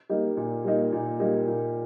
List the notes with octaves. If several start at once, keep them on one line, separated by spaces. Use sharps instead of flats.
G3 A#3 D#4
A#2
G3 A#3 D#4
A#2
G3 A#3 D#4
A#2